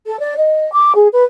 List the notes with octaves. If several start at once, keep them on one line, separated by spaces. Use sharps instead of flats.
A4
D5
D#5
D6
G#4
B4